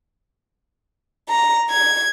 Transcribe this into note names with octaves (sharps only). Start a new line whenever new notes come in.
A#5
G#6